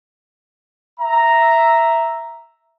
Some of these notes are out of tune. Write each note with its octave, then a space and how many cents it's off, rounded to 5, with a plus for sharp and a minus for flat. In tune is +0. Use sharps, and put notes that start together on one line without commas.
E5 +0 A#5 +0